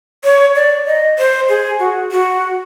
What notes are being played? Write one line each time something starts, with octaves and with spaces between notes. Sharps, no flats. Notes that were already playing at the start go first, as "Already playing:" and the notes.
C#5
D5
D#5
C5
G#4
F#4
F#4